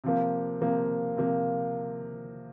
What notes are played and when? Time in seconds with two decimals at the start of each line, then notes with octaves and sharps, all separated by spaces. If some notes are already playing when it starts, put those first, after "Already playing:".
0.04 C3 F3 A#3
0.61 C3 F3 A#3
1.17 C3 F3 A#3